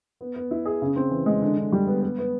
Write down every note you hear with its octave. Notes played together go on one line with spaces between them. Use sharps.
B3
B3
E4
G#4
C#3
C4
E3
G#3
D3
D3
G3
B3
B3
B3